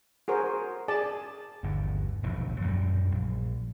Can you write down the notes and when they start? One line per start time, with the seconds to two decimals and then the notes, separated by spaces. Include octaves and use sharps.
0.28 F#4 G#4 A#4 C5
0.88 G#4 D5 A5
1.63 G1 D#2
2.23 E1 A#1 D#2
2.62 F#2 A#2 G3
3.12 A#1